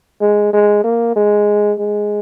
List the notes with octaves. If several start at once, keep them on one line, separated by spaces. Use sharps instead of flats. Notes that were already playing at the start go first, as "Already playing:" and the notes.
G#3
G#3
A#3
G#3
G#3